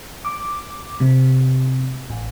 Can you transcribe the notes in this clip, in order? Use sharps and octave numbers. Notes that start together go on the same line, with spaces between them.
D6
C3
A1